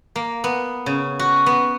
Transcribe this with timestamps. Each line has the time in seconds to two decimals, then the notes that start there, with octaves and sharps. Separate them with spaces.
0.16 A#3
0.44 B3
0.86 C#3
1.19 F#4
1.46 B3